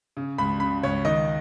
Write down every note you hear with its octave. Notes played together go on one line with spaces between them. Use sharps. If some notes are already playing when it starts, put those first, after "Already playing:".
C#3
C#2 B5
C#3 B5
C#2 C#5
D#3 D#5